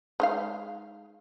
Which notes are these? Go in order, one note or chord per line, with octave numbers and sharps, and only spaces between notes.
G#3 D#4 F5